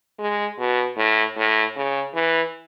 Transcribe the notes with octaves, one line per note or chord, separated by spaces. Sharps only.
G#3
B2
A2
A2
C#3
E3